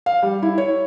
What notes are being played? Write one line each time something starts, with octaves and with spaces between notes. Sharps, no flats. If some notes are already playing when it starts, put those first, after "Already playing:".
F5
G3
E4
C#5